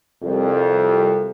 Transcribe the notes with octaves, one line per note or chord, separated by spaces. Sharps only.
C2 F2